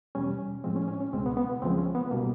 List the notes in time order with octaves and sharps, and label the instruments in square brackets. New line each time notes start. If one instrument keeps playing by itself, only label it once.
[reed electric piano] E2 B2 G3 C#4
A2 F3 G#3 C4
C#4
C#4
C#4
C#2 B2 G#3 C4
B3
B3
B3
C#2 C#3 F3 G#3 C4
C#4
B3
B2 G3 A#3